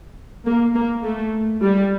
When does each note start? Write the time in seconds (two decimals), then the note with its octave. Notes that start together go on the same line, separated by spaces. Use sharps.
0.45 A#3
0.74 A#3
1.04 A3
1.63 G3